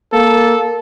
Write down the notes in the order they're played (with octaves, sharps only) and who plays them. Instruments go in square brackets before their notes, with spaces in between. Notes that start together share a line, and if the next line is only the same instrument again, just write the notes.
[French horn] A#3 [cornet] A4